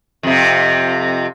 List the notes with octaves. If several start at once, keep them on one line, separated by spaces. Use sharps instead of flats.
F2 C3